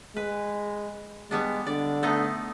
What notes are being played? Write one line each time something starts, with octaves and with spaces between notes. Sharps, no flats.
G#3 B4
G3 G#3 B3 D4
D3 D5
A3 B3 D#4